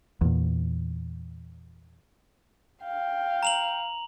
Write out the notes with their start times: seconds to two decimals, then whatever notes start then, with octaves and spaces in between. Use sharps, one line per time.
0.21 E2 A#2
2.83 F5 G5
3.43 A#5 F7 F#7